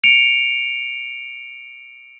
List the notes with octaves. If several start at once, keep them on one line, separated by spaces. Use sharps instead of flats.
C#7 D7 F7